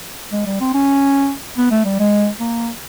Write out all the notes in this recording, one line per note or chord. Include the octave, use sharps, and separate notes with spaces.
G#3
G3
C4
C#4
B3
A3
G3
G#3
A#3